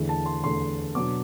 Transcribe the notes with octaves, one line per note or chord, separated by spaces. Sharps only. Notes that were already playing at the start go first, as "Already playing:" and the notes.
Already playing: E2 D3 A3 E4
A5
C6
E2 D3 A3 E4 C6
B2 F#3 B3 D4 D6